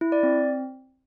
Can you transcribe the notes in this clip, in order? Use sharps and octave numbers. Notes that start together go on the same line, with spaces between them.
E4
D5
C4